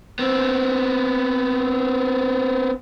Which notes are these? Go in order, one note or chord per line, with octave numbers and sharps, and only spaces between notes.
B3 C4